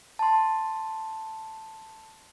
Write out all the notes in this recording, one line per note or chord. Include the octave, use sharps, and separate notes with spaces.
A5 C6